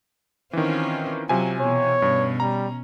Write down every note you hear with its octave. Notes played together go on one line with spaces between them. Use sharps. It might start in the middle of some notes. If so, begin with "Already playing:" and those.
D#3 E3 C4 C#4 F4
C3 F#3 F4 G#5
B2 E3 C#5
G2 B2 C#4
G3 A#5